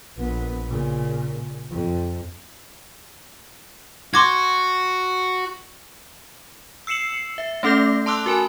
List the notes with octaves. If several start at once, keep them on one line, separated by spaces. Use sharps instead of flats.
A#1 B3
A#2 C#3
F2
F#4 C6 D6 G#6
E6 C7 C#7 E7 F#7
E5
A3 C#4 A4 D6 G6 A#6
A5 C6 D6 E6 F#6
F#4 A#4 G#5 B5